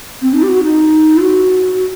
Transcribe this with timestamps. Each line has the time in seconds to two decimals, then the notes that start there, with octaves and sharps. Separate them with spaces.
0.21 C4
0.33 D#4
0.42 G4
0.48 F#4
0.63 D#4
1.20 F#4